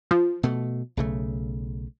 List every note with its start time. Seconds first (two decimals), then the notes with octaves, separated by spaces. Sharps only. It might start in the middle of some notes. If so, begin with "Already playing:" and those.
0.11 F3
0.43 B2 A3
0.97 B1 C#3 A3